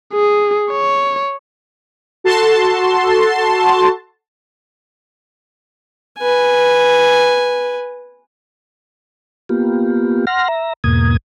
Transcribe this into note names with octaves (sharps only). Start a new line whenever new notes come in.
G#4
C#5
F#4 A4 A5 C6
B4 G#5
A#3 B3 F4 G4
F#5 C6 F6 A#6
E5 A#5
E2 G#2 B2 A#3 D#6 G#6